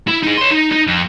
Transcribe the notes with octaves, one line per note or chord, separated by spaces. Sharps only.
E4
D#4 G#4
C#5 C6
D#4
D#4
F2